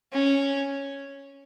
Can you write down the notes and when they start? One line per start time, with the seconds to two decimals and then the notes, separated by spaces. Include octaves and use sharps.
0.13 C#4